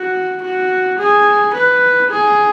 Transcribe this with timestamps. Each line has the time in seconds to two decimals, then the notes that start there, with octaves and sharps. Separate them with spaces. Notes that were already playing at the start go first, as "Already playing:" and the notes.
Already playing: F#4
0.42 F#4
0.99 G#4
1.54 B4
2.10 G#4